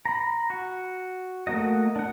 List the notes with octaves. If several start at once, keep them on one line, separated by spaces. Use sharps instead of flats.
A#5 B5
F#4
A3 A#3 F#4 D#5
D4 F#5